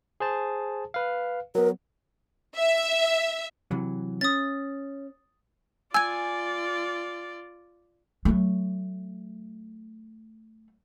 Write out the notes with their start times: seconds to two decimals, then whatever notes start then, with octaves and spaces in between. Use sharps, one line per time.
0.20 G#4 C5 A5
0.94 B4 F5
1.55 F#3 B3 A#4
2.56 E5
3.71 C3 E3 F#3
4.21 C#4 D#6 A6
5.94 F4 D5 G#5 E6 G#6
8.25 F#3 A3